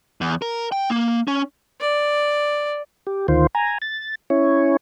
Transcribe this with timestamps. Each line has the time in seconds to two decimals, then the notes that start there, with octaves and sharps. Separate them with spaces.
0.21 E2
0.42 A#4
0.72 G5
0.90 A#3
1.28 C#4
1.81 D5
3.07 G4
3.28 D2 D#3 F4 C5
3.55 G#5 A#5
3.82 A6
4.30 C#4 E4 C#5